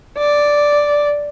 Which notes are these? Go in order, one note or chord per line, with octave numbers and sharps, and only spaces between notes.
D5